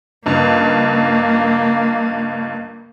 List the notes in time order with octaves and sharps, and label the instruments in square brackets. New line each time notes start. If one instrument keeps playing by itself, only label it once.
[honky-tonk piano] C#2 G2 [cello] A#3